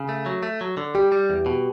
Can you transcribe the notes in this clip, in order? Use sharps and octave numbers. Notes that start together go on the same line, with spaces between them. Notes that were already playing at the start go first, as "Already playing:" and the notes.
Already playing: C#3
A3
F#3
A3
F#3
D3
G3 G4
G3
E2
B2